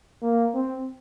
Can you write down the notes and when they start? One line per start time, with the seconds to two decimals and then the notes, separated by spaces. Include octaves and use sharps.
0.22 A#3
0.55 C4